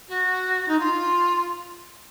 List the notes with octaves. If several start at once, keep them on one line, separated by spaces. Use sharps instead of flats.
F#4
D#4
F4